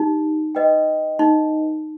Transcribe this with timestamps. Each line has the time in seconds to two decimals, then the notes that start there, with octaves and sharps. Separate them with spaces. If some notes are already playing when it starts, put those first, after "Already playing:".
Already playing: D#4 G4
0.55 B4 D#5 G5
1.19 D#4